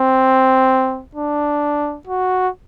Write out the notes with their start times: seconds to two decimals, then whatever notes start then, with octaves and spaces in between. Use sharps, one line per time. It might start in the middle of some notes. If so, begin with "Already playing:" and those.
Already playing: C4
1.15 D4
2.07 F#4